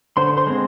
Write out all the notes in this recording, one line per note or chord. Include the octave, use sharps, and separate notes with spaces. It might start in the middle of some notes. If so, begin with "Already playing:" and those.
D3 C5 C6
C5 C6
G#3 C4